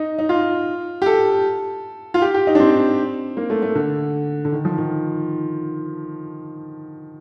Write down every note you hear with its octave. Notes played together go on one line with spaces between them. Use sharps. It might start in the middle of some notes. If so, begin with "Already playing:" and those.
Already playing: D#4
D#4
F4
G4
A4
F4
G4
G4
D#4
D4
C4
A#3
A3
A3
D3
D3
D#3
F3
D#3